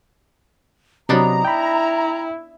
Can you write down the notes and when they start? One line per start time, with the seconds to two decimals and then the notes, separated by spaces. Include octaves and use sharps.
1.09 C3 F#3 B3 D4 D#4 A#5
1.45 E4 G5 B5